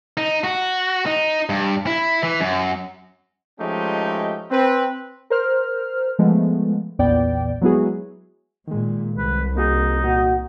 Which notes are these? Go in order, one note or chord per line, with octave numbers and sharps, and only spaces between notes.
D#4
F#4
D#4
G2
E4
E3
F#2
F3 G#3 A3 C#4 D#4 G4
C4 B4
A#4 C5 F6
F3 G#3 A3 B3
A#1 E2 A#2 B3 D5 G5
F#3 G#3 B3 E4 F#4 G#4
A#2 D#3 G#3
C2 B4
A#3 D#4 F#4 G#4
A#2 A#3 F#4